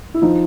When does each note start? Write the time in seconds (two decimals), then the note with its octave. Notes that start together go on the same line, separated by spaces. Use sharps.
0.14 E4
0.22 F3 D#4